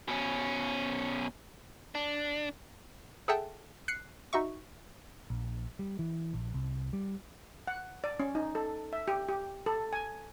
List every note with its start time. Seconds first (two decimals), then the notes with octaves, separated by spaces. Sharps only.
0.08 B2 C#4
1.95 D4
3.28 G#4 A4 E5 F#5 G5 A5
3.88 F#6 C7 C#7
4.33 D#4 F#4 E5 C#6
5.30 A#1
5.79 G3
5.99 E3
6.33 A#1
6.54 C2
6.93 G3
7.67 F#5
8.04 D5
8.20 C#4
8.35 D#4
8.55 A4
8.93 E5
9.08 G4
9.28 G4
9.66 A4
9.93 G#5